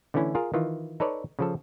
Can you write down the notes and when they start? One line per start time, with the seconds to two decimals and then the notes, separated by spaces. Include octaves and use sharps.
0.14 D3 E3 A3 C#4 E4
0.35 F4 G#4 A#4 F5
0.54 D#3 E3 F4
1.00 D#4 A4 B4 C#5 D5
1.39 C#3 F3 A4